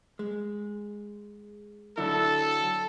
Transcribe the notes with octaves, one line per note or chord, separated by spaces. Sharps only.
G#3
D3 F#3 E4 A4